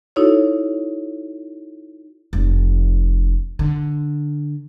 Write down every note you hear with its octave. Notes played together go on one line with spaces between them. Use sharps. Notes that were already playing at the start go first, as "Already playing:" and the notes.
D#4 E4 F#4 A4 C#5
F1
D3